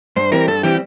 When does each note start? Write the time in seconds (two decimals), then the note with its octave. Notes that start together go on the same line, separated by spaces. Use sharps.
0.16 G2 C5
0.31 E3 G3 C4 A#4
0.48 G2 A4
0.63 E3 G3 C4 G4